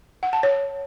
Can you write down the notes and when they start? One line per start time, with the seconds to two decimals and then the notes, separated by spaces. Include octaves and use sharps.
0.23 F#5
0.33 A5
0.43 C#5